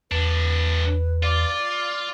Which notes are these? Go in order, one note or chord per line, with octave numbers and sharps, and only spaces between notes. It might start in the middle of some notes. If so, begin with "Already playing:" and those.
E2 A2 D4 B4
F4 D5